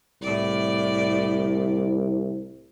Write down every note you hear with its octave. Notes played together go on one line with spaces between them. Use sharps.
C2 A2 D5